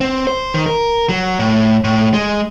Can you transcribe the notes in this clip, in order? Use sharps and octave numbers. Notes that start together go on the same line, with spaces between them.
C4
C5
D#3
A#4
F#3
A2
A2
G#3